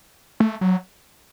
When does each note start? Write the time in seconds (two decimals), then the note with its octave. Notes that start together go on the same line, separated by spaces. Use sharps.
0.40 A3
0.61 F#3